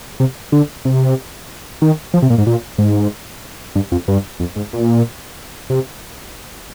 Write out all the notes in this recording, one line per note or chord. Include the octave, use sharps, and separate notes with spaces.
C3
D3
C3
D#3
F3
C3
A#2
G#2
A#2
G#2
G2
F2
G2
F2
G#2
A#2
C3